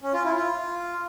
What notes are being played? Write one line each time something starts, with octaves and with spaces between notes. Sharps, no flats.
C#4
F4
E4
F4